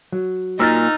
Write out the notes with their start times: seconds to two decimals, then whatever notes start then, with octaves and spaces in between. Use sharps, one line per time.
0.12 F#3
0.60 A#2 D#4 E6 F6 A6